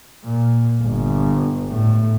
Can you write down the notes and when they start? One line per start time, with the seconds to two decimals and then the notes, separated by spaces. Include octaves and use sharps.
0.24 A#2
0.83 G1
1.69 A2